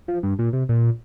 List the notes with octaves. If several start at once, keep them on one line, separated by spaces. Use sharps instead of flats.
F3
G2
A#2
C3
A#2